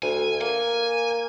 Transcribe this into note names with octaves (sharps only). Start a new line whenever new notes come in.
D2 G#5
A#3 G#5